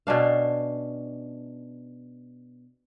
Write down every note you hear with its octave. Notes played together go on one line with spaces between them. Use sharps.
B2 C#4 D4 F5